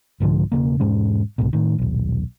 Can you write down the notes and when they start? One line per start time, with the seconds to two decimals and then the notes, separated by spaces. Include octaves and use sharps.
0.20 C2 G#2 D3 F3
0.52 E1 D#2 C#3 A#3
0.80 E1 G#2 G#3 C#4
1.38 C2 G#2 B2
1.53 A2 D#3
1.78 D#1 B1